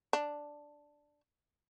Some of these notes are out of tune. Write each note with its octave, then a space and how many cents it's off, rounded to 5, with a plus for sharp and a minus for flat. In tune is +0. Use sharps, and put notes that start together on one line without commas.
D4 +0